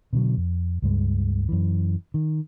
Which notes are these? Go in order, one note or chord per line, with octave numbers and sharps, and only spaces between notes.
B2 D3 F3 F#3
F2
C#2 G2 G#3
F#2 E3
D#3